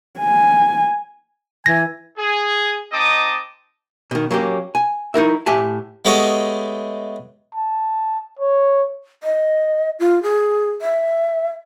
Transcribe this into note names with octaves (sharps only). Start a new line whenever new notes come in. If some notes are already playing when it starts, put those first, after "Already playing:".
G#5
E3 G#5 A#6
G#4
C4 D#4 D#5 A5 D6 D#6
B2 D#3
F#3 A#3 C#4 G4
G#5
D#4 E4 A#4 E5
A2 G4 E5 G#5 A5
G#3 A3 B3 G4 C#5 D#5
A5
C#5
D#5
F4
G#4
E5